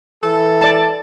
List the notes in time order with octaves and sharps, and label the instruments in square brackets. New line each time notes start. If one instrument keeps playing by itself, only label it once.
[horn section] E3 A4
[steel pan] D5 A5